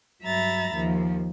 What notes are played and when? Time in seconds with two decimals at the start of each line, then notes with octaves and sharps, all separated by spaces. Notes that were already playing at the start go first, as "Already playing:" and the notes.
0.23 G2 F#3 E5 A#5 B5 A6
0.74 D#2 F3